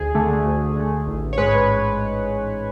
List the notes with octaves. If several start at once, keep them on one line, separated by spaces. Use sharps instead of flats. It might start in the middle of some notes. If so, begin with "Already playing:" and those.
Already playing: D2 G#4
D3 A3
D2
D3 A3
A1
C#5
G#2 G#3 B4